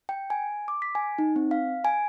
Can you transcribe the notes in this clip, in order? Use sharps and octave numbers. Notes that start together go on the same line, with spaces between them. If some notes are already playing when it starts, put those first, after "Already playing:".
G5
G#5
D6
B6
G#5
D#4
C4
F5
G#5